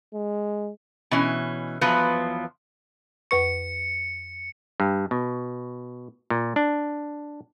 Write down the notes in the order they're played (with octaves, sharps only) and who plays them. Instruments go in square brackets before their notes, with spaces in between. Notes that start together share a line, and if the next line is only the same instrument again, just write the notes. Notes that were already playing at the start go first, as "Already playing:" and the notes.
[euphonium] G#3
[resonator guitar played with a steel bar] B2 E3 C#4
E2 F3 F#3 B3 F4 B4
[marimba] F2 B4 C#6 [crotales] C#7
[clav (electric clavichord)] G2
B2
A#2
D4